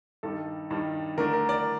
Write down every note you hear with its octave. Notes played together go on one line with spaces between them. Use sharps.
G2 D#3 G3 A4
G2 D#3 G3
D3 A3 D4 A#4
A#4
A#4 D5